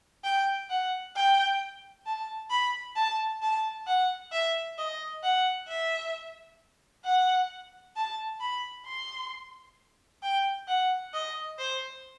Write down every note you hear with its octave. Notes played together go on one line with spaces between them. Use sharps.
G5
F#5
G5
A5
B5
A5
A5
F#5
E5
D#5
F#5
E5
F#5
A5
B5
C6
G5
F#5
D#5
C5